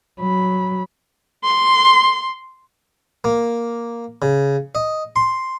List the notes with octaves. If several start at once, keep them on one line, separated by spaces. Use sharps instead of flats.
F#3 B5
C6
A#3
C#3
D#5
C6